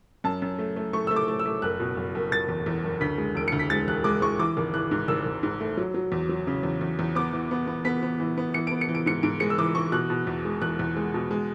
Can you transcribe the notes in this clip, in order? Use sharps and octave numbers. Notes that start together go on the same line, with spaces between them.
F#2 A5
F#2
A3
A3
A3 C#6
A3 E6
D6
A3
E6
A3
F#1 F#6
B2
F#1
F#1
F#1 A6
E2
E2
F#1
D2 B6
G#3
E1 D7
D2 C#7
B6
G#3 A6
E1 F#6
G#3 D6
G#3 C#6
E3 D6
G#1
E3 F#6
G#2
G#1 E6
G#1
G#2
A3
F#3
F#3
E2
F#3
C#3
E2
E2
E2
B3 D6
E3
B3
B3
B3 B6
B3
E3
B3
E3 C#7
B3 D7
C#7
E3
D7
G#2 C#7
G#2 D7
G#3 C#7
E6
E3 D6
E3 C#6
B2 F#6
B2
E2
G#3
E2 F#6
E2
G#3
B2
G#3